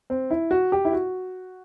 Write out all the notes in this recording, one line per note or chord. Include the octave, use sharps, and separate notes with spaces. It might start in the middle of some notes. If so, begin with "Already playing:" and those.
C4
E4
F#4
G4
E4
F#4